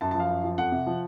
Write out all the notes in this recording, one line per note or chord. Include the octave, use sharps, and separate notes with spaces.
F#2 A5
A5
F3 F5
F#2
F3
F2 F#5
C3
F3